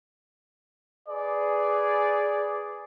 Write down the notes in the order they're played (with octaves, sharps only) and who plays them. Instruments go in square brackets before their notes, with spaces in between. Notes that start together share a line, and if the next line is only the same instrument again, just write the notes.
[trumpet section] G#4 B4 D5